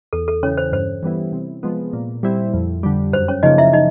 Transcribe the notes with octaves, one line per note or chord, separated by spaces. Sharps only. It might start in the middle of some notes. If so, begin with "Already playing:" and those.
E2 A4
A4
C#3 E3 C#4 C#5
C5
G2 C5
E3 G3 B3 E4
C3
F3 G#3 B3
A#2
G3 C4 E4
F2
D3 G3
F#2 C5
C#4 C#5
C#3 F3 A#3 D#4 D#5
E4 E5
D#4 D#5